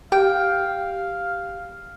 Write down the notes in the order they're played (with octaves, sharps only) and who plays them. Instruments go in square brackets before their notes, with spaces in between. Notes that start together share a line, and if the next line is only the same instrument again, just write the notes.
[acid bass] G4 [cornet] F5 [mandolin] G5